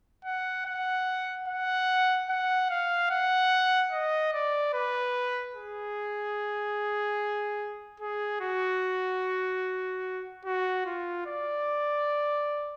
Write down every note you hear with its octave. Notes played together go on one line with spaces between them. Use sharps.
F#5
F#5
F#5
F#5
F5
F#5
D#5
D5
B4
G#4
G#4
F#4
F#4
F4
D5